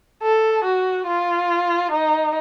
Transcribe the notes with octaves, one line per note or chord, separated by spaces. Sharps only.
A4
F#4
F4
D#4